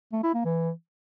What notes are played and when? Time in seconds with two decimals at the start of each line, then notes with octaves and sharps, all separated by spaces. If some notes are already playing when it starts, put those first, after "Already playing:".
0.12 A3
0.23 E4
0.34 A#3
0.45 E3